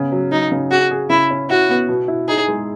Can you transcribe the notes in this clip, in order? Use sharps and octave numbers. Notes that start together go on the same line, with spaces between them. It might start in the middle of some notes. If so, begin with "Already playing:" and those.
Already playing: C#3 B3
F#3
F#3 D#4
C#3
F#4 G#4
G#4
C#3 E4
C#4
E4 F#4
B3
B2
E4
D#4 G#4
G#3